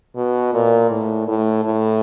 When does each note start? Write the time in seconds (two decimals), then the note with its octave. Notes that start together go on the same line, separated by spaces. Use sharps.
0.16 B2
0.54 A#2
0.91 A2
1.28 A2
1.65 A2